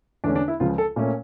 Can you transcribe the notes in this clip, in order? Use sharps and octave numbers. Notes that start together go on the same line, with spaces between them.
E2 D3 A3 C#4 D4
D4
E4
C#2 C#3 F3 F4
A4
A#2 A3 C#4